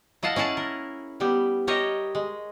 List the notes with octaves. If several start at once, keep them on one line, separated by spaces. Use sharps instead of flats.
E4 D#5 F5 F#5 A5
C#4 E4 G#4 F#5 A5
A#4
G3 B3 G4
G4 A#4 C#5 D#5 E5
G#3